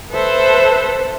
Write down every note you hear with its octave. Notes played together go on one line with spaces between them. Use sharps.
A4 B4 C5 E5